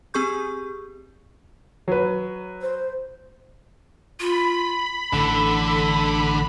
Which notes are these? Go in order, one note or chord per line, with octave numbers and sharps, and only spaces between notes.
C4 G4 G#4 C#6 G6
F#3 B4
C5
F4 B5
A1 D3 E3 A4